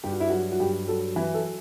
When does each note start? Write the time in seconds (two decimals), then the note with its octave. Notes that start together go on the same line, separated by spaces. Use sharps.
0.04 G2 G4
0.12 F#4
0.20 E4
0.29 F#3 F#4
0.52 F#4
0.60 G2 G4
0.88 F#3 A4
1.16 E3 B4
1.34 A4